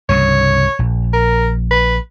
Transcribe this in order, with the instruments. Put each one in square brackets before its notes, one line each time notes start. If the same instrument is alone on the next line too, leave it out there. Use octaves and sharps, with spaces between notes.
[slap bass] C2 G2 C#3 [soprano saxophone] C#5
[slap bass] A#1
[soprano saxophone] A#4
B4